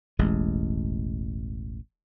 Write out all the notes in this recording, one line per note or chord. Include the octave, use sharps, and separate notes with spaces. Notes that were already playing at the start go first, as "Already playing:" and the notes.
E1 A1 G#3